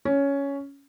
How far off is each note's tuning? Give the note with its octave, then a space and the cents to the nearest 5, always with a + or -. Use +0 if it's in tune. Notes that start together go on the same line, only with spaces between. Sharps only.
C#4 +10